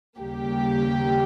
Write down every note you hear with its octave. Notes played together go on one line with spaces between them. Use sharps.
D#2 C#3 G3 A#3 G4